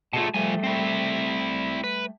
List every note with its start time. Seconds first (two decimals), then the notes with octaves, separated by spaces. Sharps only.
0.13 B2 A3 F4 G#4 A5
0.34 F3 G3 A3 G#5
0.64 C4 E4
1.84 B4